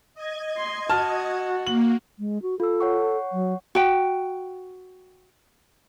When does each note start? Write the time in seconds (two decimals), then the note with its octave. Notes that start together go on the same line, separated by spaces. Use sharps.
0.14 D#5 G#6
0.57 C6
0.90 F#4 A5 F6
1.67 A#3 F#7
2.19 G#3
2.42 F#4
2.60 F4 A4 E6
2.80 C#5 F#5 C#6
3.32 F#3
3.75 F#4 G5